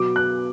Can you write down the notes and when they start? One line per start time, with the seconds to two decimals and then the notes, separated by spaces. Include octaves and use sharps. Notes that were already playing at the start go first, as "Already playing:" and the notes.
Already playing: B2 F#3 B3 D6
0.16 F#6